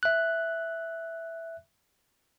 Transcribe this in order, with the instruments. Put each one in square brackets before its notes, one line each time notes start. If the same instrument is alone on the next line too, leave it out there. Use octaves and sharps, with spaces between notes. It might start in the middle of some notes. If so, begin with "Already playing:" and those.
[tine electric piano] E5 F#6